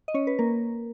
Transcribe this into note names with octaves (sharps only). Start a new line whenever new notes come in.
D#5
C#4 C#5
B4
A#3 A#4